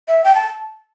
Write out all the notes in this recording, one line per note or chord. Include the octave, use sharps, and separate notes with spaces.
E5
G5
A5